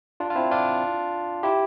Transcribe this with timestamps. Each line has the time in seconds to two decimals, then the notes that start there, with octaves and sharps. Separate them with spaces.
0.20 D4 F4
0.30 F4
0.35 C4 E4
0.51 D4 F4
1.43 E4 G4